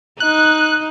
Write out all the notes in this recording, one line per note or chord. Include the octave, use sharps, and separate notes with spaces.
D#4 F#6